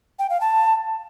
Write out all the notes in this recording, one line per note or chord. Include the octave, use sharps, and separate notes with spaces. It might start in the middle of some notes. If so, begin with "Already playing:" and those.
G5
F5
A5